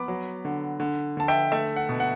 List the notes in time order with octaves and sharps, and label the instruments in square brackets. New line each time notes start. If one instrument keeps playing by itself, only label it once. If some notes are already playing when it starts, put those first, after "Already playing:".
Already playing: [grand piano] B3 B5 D6
F#3
D3
D3
D3 A5
E5 G5
A3 E5
F#5
B2
F#5